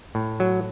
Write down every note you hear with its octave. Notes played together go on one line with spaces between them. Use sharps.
A2
F#3